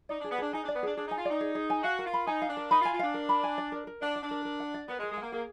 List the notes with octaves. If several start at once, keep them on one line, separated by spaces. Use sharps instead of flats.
D#4 D5
D4 G#4
B3
D4 G#4
D#4 G#5
D4 D5
B3
D4 G#4
D4 G#4
D#4 G#5
F4
D#4 D5
G#4
G#4
G#5
F#4 F5
A#4
F4
B5
D#4 G#5
F5
D4
A#4
D#4 B5
F4
G#5
F4
D4 F5
A#4
B5
G#5
D5
A#4
A#4
D4 F#5
D5
D4
A#4
A#4
F#5
D5
B3 A#4
G#3
A#4
G#3
A#3 F#5
A#3 G#4